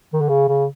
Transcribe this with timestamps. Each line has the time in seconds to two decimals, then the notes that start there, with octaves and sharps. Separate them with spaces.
0.13 D#3
0.21 D3
0.29 C#3
0.48 C#3